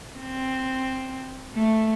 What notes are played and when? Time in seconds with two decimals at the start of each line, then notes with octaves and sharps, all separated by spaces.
0.17 C4
1.54 A3